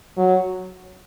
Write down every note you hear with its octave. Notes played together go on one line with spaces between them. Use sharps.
F#3